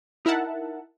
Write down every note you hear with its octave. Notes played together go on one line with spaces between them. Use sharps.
D#4 E4 A#4 E5 F#5 A5